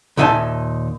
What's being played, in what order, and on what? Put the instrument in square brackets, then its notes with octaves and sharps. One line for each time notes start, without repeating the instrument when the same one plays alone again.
[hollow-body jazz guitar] D#2 A#2 D#4 E5 G#5 A5